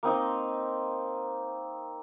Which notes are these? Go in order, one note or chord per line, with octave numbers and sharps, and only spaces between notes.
A#3 C4 D#4 D#5